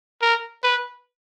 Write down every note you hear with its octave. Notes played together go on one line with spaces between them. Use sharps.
A#4
B4